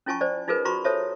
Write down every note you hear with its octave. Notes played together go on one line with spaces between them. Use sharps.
C#4 E4 F4 G#5 A5 C#6
C5 D5
D#4 F4 G#4 A#4 B4
F4 F#4 A#5 B5 C#6
A4 C5 C#5 E5 A5